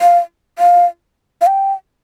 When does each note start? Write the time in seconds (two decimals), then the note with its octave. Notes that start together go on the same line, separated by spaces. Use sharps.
0.01 F5
0.59 F5
1.41 F5
1.47 G5